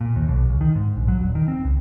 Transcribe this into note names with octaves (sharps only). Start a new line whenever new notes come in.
A#2
D#2
B1
C#2
D#3
G#2
A#1
F#3
D#1
D#3
C4
C#2